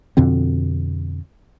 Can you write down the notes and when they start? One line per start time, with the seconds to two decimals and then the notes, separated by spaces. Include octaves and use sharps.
0.17 F2 B2 D3 C4